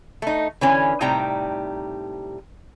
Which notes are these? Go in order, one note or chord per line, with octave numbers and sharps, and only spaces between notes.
A3 D#4
D3 E3 C#4
A2 C3 G3 D#4 G5 A#5